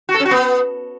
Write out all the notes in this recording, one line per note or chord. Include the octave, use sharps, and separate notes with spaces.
F#4
A4
C#4
F#4
B3